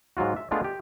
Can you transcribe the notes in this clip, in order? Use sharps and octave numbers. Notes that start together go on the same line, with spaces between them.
G#2 F#3 F4 F#4
E5
G#3 A3 B3 D4 F4
G4